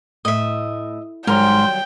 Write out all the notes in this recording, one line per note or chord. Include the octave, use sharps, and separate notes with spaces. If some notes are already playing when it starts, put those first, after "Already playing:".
A2 D#5 E5
G#2 D#3 F#3 G3 A#4 G5 A#5 C6